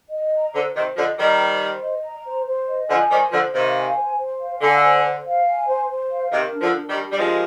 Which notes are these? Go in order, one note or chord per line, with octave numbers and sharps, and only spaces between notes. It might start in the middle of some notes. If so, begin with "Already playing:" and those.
D#5
A#5
D3 C5
C3 D#3 C5
D3 F3 D#5
D#3 G3 A#5
C5
C5
D#5
A#5
C5
C5
D#5
D3 F3 G#5
D#3 G3 C5
D3 F3 C5
C3 D#3 F5
G#5
C5
C5
F5
D3 G#5
C5
C5
F5
G#5
C5
C5
F5
C3 D#3 A#4
D4
D3 F3
D4
D#3 G3
G4
G3
F3 G#3 A#4